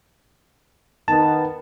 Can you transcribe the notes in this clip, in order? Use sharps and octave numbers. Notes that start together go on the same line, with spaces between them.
D#3 B3 A5